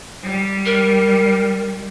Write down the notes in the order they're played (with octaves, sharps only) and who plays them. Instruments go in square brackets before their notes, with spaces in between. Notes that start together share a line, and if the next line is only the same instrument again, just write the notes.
[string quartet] G3
[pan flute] A#4